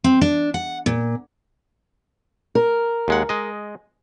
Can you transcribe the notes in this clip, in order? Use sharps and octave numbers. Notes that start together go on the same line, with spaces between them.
C4
D4
F#5
A#2
A#4
D#2 G#3 F#5
G#3 D#5